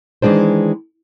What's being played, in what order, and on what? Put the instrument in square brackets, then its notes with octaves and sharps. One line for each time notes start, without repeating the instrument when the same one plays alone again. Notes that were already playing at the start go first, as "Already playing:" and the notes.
[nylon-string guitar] D#3 E3 G3 G#3 D4 C5